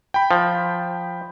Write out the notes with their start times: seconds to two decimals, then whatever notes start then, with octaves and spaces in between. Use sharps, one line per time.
0.14 G5 B5
0.31 F3